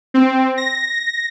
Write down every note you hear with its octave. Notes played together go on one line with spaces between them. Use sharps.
C4
A#6